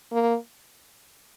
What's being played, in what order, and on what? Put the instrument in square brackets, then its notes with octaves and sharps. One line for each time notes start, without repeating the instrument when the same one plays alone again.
[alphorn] A#3